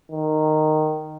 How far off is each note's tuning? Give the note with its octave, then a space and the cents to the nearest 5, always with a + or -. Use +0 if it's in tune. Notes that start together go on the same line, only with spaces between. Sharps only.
D#3 -10